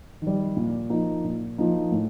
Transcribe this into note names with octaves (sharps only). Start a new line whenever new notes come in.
D#3
G3
A#2
F3 A#3 D#4
A#2
F3 A#3 D#4
A2